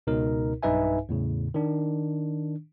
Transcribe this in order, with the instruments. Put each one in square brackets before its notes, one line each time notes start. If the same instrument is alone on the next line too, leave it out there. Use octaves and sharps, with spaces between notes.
[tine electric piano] C#2 B2 D#4 A#4
B1 G2 D#4 B4 E5 G#5
E2 A2 C#3
D#3 D4